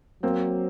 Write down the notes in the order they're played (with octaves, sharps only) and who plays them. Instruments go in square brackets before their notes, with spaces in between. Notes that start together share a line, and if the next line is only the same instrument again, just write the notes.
[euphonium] F#3 [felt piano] A#3 C4